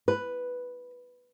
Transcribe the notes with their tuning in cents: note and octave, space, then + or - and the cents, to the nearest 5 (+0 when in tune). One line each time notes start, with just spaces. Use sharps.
B4 +0